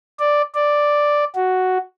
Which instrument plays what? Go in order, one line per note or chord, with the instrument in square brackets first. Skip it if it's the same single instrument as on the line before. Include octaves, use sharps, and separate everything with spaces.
[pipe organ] D5
D5
F#4